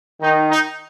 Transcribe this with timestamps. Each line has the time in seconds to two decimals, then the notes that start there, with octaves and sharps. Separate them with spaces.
0.22 D#3 D#4
0.51 D#4